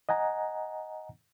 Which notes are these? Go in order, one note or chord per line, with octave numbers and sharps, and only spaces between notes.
D#5 F#5 G#5 A#5